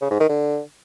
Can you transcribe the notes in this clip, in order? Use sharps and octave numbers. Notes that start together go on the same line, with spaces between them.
C#3
G#2
D#3
D3